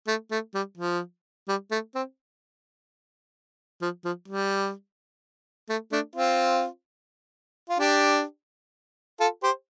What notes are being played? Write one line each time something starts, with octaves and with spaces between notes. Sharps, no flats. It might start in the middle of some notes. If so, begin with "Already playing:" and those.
A3
A3
G3
F3
G3
A3
C4
F3
F3
G3
A3
A3 D4
C4 F4
F4
D4 G4
F4 A4
G4 C5